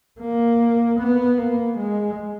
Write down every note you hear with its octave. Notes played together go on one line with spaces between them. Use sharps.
A#3
B3
A#3
G#3